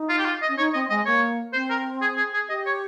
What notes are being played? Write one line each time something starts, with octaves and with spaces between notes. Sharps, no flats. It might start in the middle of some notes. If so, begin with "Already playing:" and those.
Already playing: D#4
F4
G4
F4
D#5
C#4
D#4 C#5
C4 D#5
G#3 D#5
A#3 C#5
C4 C5
A#4
G#4
G#4
G#4
G4 D#5
C#5